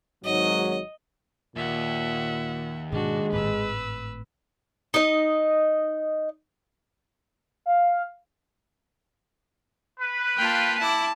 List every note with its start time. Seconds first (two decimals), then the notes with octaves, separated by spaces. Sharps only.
0.24 G#1 G#2 F#3 D#5
1.56 D#2 A#2 E5 F#5
2.92 G#2 B2 G#3 D4 F#4
3.32 G#1 A2 B4 E6
4.94 D#4 D#5
7.66 F5
10.00 B4
10.37 A#3 F4 F5 G5 A5
10.79 E4 A5 D6